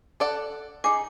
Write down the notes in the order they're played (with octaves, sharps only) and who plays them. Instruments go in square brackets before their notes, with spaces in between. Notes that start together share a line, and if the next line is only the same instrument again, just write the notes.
[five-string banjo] A4 D5 F#5
[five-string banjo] D#4 G#4 [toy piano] D6